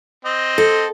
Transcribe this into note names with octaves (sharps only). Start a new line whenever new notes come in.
C4 D#5
A4